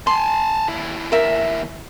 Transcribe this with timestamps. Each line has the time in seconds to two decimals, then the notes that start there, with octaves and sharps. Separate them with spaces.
0.07 G#5 A5 C6
0.68 D#2 E4
1.12 A#4 E5